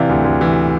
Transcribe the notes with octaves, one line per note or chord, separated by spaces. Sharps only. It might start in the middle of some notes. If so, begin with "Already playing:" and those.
Already playing: C3 E3 D5 F5
D2
D2
E3